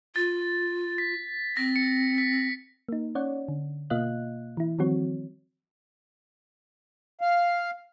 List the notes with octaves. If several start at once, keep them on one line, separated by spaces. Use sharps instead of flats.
F4 A6
B6
C4 A#6
C#7
B6
A#3 D#4
C#4 C#5 D5 F#5
D3
B2 A#3 F4 D#5 F5 F#6
E3 E4
D#3 F3 G3 C4 F#4 C#5
F5